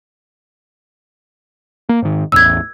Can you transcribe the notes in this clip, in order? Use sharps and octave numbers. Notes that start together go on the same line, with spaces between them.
A#3
G#2 D#3
A1 E2 A2 E6 G#6